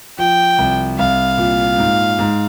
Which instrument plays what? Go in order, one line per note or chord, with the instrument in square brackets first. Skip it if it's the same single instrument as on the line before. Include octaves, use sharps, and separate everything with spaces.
[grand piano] F3 [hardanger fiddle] G5
[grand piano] C2
[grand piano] C2 [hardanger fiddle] F5
[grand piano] A#2
G#2
G#2